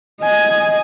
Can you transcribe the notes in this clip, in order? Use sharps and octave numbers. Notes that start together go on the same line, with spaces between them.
D#5 G#5